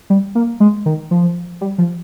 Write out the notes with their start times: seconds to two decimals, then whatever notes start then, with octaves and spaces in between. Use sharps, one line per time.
0.10 G3
0.35 A#3
0.60 G#3
0.86 D#3
1.11 F3
1.61 G3
1.78 F3